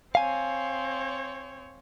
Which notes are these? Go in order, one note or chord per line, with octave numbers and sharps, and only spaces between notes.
C4 C#5 F5 G#5